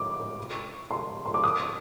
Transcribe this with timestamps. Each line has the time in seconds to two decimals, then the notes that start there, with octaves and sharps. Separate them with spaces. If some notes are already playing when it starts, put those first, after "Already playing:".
Already playing: D6
0.91 C6
1.26 C6
1.34 D6
1.44 D#6